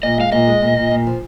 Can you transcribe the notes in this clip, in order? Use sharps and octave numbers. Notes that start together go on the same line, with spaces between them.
A#2 D#5
G#3 F5
A#2 D#5
G#3
A#2
A#2
A#2
F3